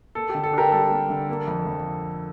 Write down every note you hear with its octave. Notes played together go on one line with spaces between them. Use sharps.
A#3 A4
G4
D3
A4
D4 G4 A#4
G3 A4
A#3
D3
A#3
F2
F2